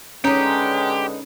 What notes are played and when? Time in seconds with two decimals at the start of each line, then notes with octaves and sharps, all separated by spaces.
0.24 D3 G#3 C#4 D#4 G4 B4